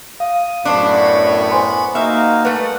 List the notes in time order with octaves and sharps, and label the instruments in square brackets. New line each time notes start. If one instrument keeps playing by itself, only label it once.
[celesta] F5 [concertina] D#6
[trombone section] F#2 A2 [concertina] B3 B5 C#6 [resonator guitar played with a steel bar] D4 C5
[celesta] C5 G#5 C6
[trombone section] A#3 [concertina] D#4 F#4 F5 [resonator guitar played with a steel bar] E5
[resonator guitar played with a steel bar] G3 A3 [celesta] B4 [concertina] F#5